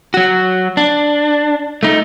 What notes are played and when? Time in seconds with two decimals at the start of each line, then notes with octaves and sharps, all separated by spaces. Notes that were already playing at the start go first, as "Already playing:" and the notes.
0.14 F#3 F#4
0.77 D4
1.83 A3 D#4